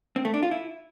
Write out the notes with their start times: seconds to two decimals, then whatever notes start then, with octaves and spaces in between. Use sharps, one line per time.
0.16 C4
0.25 A3
0.34 D4
0.43 F4
0.51 E4